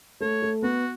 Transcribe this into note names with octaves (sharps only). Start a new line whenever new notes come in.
A3 C#5
A3
B3 F#4